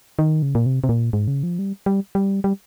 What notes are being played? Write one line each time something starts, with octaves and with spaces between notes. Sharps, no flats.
D#3
C#3
A#2
C3
C3
A#2
G#2
C#3
F3
G3
G3
G3
G3